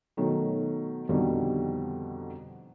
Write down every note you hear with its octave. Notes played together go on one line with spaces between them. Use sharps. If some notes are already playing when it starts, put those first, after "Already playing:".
B2 D#3 F#3 A3
F2 B2 D3 D#3 G3